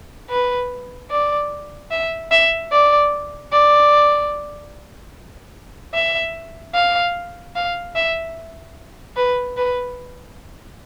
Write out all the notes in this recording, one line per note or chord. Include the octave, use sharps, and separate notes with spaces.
B4
D5
E5
E5
D5
D5
E5
F5
F5
E5
B4
B4